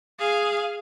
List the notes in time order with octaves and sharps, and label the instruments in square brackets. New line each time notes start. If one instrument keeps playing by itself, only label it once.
[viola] G#4 F5